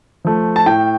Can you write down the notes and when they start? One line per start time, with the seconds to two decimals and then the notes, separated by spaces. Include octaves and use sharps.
0.25 F3 A3
0.56 A5
0.66 A2 G5